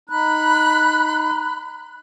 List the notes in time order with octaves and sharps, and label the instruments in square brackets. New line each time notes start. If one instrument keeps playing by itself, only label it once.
[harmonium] D#4 [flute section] B5 F#6